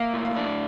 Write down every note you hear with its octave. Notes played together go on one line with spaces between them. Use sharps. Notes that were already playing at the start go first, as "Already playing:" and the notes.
Already playing: A#3 E5 F5
A2
F5
D4